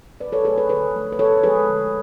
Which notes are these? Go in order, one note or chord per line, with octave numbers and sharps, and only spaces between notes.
B2 B4 D5
A4 C#5
F#3 A3 G#4 B4
G#4 B4
D3 G#4 B4
F3 A3
B4
D3 A4 C#5
F3 G#3 G#4 B4
D3